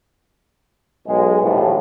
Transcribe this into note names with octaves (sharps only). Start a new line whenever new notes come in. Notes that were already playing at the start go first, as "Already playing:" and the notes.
B1 G#3
A#1 D#2 A2